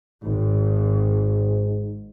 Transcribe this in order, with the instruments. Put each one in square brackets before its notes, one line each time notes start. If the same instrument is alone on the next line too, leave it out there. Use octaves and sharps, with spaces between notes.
[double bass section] G#1 [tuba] G#2